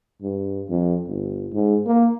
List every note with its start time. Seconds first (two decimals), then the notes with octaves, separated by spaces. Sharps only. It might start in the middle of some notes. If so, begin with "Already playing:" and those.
0.22 G2
0.69 F2
1.07 G1
1.53 G#2
1.86 A#3